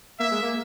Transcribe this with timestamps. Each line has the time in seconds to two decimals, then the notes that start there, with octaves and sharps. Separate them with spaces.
0.20 A#3 E5
0.31 G#3
0.43 A#3